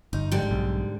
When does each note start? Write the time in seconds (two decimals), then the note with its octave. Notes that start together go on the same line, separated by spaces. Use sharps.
0.13 G1 D#4
0.32 G#2 D3 G3
0.51 B1